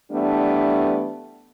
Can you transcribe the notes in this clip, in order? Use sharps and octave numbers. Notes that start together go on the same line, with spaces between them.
E3 G3 A3 B3 D4